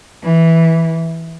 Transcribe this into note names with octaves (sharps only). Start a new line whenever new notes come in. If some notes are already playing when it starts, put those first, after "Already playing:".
E3